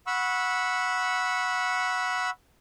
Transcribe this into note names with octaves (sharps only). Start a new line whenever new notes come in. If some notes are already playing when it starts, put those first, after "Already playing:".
F#5 B5 C#6 E6